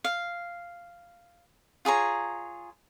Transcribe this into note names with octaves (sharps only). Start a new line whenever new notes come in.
F5
F4 G#4 C#5 A#5